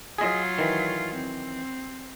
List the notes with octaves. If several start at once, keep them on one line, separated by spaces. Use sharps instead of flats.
F#3 F4 G#4 D#5
D#3 E3
C4